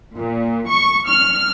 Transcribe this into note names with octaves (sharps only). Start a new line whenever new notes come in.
A#2
C#6
F6